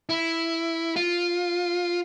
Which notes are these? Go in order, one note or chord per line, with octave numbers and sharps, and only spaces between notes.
E4
F4